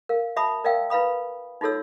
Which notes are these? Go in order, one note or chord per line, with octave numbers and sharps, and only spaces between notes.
A#4 F5
F#4 E5 A5 B5 D#6
A#4 D5 E5 F5 G5 E6
E4 B4 F5 B5 D#6
D#4 F4 F#4 A4 C#5 E6